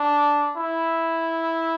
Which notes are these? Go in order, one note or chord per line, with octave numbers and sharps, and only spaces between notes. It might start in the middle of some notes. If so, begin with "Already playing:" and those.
Already playing: D4
E4